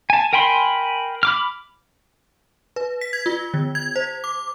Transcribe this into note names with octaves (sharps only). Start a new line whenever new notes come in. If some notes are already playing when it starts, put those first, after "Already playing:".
G#5 A5
A#4 G5 G#5 B5 C6
B5 D6 F6
B4
B6
G#6
F4
D3
G#6
C5
D6